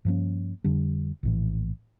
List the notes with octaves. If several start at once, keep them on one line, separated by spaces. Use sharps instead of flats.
G2 F3 A#3 C#4
F2 D3 G3 D4
A#1 A2 E3